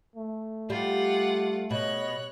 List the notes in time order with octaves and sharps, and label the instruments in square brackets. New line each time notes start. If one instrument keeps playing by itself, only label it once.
[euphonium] A3
[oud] G3 [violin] F4 F#5 [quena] G4
[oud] B2 [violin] C#5 F#6 [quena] D#5